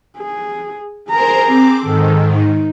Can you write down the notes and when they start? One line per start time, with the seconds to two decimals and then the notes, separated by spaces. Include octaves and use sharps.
0.18 G#4
1.10 G#4 A#4 C5 A#5
1.47 C4 D6
1.82 G#2 D#3 A4
2.34 D#4